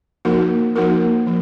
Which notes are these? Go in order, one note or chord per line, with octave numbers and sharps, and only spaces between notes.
F3 A#3 D#4 F#4 A#4
F3 A#3 D#4 F#4 A#4
F3